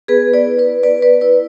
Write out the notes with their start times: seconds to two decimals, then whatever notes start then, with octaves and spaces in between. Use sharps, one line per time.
0.08 B3 G#4 B4
0.34 B4 D5
0.46 E4
0.59 B4 D5
0.83 B3 B4 D5
1.02 B4 D5
1.21 E4 B4 D5